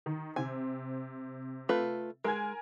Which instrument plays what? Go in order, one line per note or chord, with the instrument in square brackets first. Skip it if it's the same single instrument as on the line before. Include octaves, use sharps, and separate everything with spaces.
[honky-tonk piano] D#3
[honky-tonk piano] C3 C4 [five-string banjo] G#5
[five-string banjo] A3 F4 B4
[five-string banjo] G#3 [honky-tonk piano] A#4 G#5 G#6